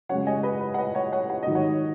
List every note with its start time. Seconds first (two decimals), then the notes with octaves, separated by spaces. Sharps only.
0.09 F#2 C#3 G#3 C#5 F#5
0.27 D#5 G#5
0.43 B4 D#5
0.61 B4
0.74 F#5
0.78 B4 D#5
0.95 C#5 F#5
1.12 C#5 F#5
1.30 F#5
1.43 G#2 D#3 F#3 D#5
1.55 C#5 F#5